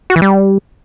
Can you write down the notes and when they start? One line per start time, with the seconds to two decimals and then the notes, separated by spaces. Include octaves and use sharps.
0.10 F#4
0.16 E3
0.22 G3